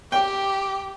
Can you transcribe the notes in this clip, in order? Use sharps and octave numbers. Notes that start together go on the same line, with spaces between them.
G4 G5